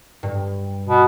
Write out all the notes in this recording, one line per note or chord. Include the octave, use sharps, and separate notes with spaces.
G2
B2